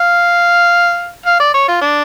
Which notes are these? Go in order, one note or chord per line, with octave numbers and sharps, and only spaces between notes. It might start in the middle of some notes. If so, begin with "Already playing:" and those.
Already playing: F5
F5
D5
C#5
F4
D4